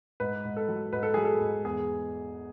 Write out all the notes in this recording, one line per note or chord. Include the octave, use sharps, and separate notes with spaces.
G#2 B4
G#2
A4
F#3
G#2 B4
A4
F#3 G#4
A4
G#2
E2 G#4